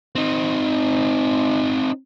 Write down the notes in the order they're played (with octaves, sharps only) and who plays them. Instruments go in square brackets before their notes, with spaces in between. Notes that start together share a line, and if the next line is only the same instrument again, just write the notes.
[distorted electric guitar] C4 D#4